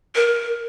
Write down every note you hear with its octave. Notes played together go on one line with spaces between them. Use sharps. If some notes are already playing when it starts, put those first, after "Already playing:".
A#4